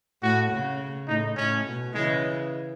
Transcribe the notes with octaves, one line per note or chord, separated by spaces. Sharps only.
A2 F#4
C#3
A2 D#4
A2 C#4
B2
C#3 E3 G#3